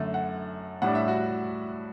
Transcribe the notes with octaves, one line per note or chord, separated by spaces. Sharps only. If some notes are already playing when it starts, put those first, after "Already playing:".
Already playing: F#2 D3 A3
F#5
A2 G3 D4 F#5
E5
F#4